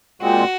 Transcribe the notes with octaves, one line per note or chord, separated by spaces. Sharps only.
A#2 G#3 C4 F#4